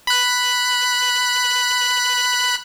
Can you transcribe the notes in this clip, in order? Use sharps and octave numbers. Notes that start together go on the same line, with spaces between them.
B5 F#6